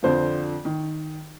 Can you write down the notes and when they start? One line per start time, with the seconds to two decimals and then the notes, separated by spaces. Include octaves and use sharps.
0.03 F2 D3 F3 C5
0.65 D#3